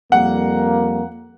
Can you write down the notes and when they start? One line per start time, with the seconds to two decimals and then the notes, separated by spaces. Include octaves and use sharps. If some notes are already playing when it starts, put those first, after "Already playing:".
0.12 F2 G3 A#3 F#5